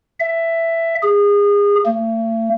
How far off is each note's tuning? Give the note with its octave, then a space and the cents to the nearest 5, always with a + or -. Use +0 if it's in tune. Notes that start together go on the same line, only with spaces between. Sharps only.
E5 +10
G#4 -30
A3 +45